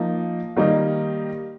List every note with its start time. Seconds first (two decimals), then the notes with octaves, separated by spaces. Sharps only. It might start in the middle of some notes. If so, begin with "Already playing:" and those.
Already playing: F3 A#3 D#4
0.57 D#3 G3 A#3 D#4